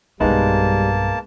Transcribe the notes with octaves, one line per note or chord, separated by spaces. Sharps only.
B1 G2 G3 G#3 A#3 B3 D#4 A5